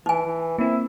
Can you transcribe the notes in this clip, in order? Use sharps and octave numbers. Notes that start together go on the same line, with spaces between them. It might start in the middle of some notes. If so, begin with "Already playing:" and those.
E3 D#4 G#5
E3
A#3 C4 E4